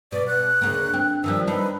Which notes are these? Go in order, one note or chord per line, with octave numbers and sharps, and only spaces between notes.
B2 D5
F#6
D2 C#3 A#3
C4
D#3 F3 G3 E6
D4 D#4 B4